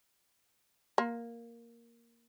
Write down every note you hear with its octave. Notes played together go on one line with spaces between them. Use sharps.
A#3